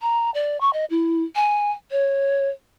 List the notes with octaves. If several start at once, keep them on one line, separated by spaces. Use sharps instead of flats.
A#5
D5
C#6
D#5
E4
G#5
C#5